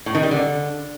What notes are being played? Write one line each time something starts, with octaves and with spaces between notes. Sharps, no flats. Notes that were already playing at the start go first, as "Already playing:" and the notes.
A2
D#3
G3
D3